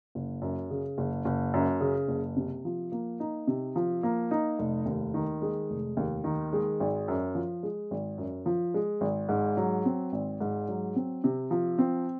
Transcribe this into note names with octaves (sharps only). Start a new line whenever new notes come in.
F#1
F#2
C#3
F#1
F#1
F#2
C#3
F#1
C3
F3
A#3
D#4
C3
F3
A#3
D#4
F1
D#2
D#3
G#3
F1
D#2
D#3
G#3
G#1
F#2
F3
G#3
G#1
F#2
F3
G#3
G#1
G#2
F#3
C4
G#1
G#2
F#3
C4
C3
F3
C4